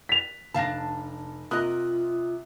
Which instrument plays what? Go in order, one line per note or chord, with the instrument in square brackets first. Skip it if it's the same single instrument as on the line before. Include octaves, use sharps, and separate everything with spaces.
[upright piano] B6 F7
[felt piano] F1 A#6 [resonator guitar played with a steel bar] D4 F5 A5
[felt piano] C3 D#6 F#6 [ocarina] F4 [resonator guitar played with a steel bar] A#4 D#5